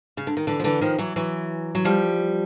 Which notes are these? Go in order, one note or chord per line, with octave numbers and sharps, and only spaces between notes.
C#3
D3
D#3
D3 E3
F3
D3 E3
D#3 F3
E3 F#3
E3 F#3
F#3
F3 G3